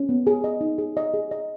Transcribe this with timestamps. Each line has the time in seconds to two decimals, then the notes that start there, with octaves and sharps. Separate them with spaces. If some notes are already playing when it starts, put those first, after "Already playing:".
Already playing: C#4
0.09 B3
0.27 G#4
0.44 D#5
0.61 D#4
0.78 G#4
0.97 D#5
1.14 G#4
1.31 D#5